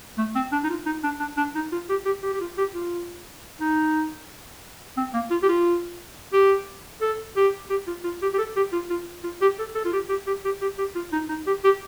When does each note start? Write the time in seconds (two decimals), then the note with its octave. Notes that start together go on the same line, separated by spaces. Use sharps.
0.18 A3
0.36 C4
0.52 D4
0.64 D#4
0.70 F4
0.86 D#4
1.04 D4
1.20 D4
1.37 D4
1.55 D#4
1.72 F4
1.89 G4
2.06 G4
2.23 G4
2.33 G4
2.40 F4
2.58 G4
2.74 F4
3.60 D#4
4.97 C4
5.14 A#3
5.30 F4
5.43 G4
5.48 F4
6.33 G4
7.01 A4
7.36 G4
7.70 G4
7.87 F4
8.04 F4
8.22 G4
8.34 G4
8.38 A4
8.56 G4
8.73 F4
8.90 F4
9.24 F4
9.42 G4
9.59 A4
9.75 A4
9.85 F4
9.93 G4
10.09 G4
10.27 G4
10.44 G4
10.61 G4
10.78 G4
10.95 F4
11.12 D#4
11.29 D#4
11.47 G4
11.64 G4